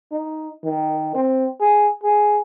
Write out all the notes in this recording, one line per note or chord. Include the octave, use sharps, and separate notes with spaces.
D#4
D#3
C4
G#4
G#4